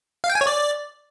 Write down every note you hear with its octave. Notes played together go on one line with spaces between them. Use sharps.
F5
G5
G#5
C#5
D5